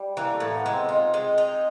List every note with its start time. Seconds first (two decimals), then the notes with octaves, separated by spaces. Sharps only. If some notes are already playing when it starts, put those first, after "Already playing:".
Already playing: G3
0.17 E3 A#3
0.32 A3
0.40 A2 A#3
0.57 B3
0.66 G#3
0.73 C4
0.89 D#4 F4
1.14 G#3
1.38 D#4